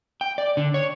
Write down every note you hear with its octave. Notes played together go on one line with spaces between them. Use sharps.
G5
D5
D3
C#5